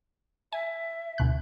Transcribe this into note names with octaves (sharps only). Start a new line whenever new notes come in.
E5 G#5
D2 B2 F#6